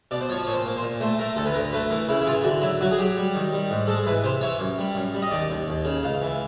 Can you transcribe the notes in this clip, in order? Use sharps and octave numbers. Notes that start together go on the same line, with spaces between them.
B2 D5
C5
F3 C#5
A#2 C#5
C5
A#3
C5
A#2
A3 C5
A3 A#4
D2 A4
B4
D2 A#4
A3 B4
E3 A#4
C#3 E4
E4
E3 F4
D3 F#4
F#3 E4
F#3 F#4
G#4
F#3 G4
G3
D#3
G3
G#2
G#3 A4
E3 B4
C3 C5
E3 C#5
F#2
G3
F#2
G3
D#5
D#2 D5
D#2
D#2
C#3
C#2 F5
E3